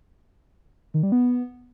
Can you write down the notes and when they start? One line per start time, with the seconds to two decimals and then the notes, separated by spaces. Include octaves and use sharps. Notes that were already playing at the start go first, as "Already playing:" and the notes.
0.94 D#3
1.03 G3
1.12 B3